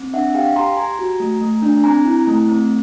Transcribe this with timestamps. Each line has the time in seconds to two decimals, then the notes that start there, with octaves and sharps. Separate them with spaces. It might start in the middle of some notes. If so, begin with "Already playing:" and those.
Already playing: C4
0.13 D4 E5 F#5
0.34 G4 F5 G5
0.56 G4 A#5 C6
0.77 G4 G#5 A#5
0.99 F#4
1.20 A3
1.41 A3
1.62 D4
1.84 C4 G#5 A#5
2.05 E4
2.27 A3
2.48 C4